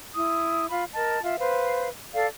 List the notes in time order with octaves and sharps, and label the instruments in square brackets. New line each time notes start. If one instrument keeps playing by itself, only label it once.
[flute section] E4 D#6
F4 B5
A#4 D#5 A5
F4 E5
B4 C5 F5
A4 D5 F5